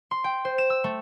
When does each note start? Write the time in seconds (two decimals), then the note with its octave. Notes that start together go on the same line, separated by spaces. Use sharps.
0.11 C6
0.24 G5
0.45 C5
0.58 E7
0.70 E6
0.84 A3